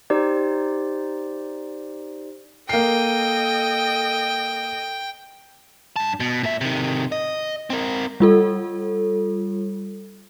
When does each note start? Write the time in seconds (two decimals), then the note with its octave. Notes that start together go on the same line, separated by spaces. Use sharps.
0.10 D#4 G4 C5 D5
2.69 A#3 A4 D#5 G5 C7
5.96 G2 A5
6.20 B2
6.43 A#2 E5
6.61 C3 D#3
7.12 D#5
7.70 C4 A#4
8.20 G3 F4 A4